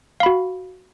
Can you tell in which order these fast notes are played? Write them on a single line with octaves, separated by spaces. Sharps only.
F5 B5 F#4